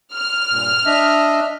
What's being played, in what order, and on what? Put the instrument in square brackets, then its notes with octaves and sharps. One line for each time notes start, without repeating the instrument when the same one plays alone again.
[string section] F6
[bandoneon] G2 A#2
D4 D#5 E5